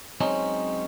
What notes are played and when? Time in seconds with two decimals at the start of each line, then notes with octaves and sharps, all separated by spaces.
0.21 F#3 G#3 C4 C#4 D#4